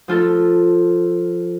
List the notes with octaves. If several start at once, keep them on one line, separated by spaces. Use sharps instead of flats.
F3 F4 A4